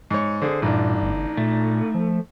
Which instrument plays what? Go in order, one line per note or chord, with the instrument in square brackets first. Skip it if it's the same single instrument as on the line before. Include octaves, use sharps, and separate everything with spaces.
[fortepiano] G#2 C#5
[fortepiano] D3 G#4 [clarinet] C5
[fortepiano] A1 D4 [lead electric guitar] G2 [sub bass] A#2 [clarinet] D#4
[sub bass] G1
[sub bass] A#2 [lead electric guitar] A3
[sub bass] F3